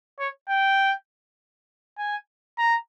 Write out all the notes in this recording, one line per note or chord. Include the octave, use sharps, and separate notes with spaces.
C#5
G5
G#5
A#5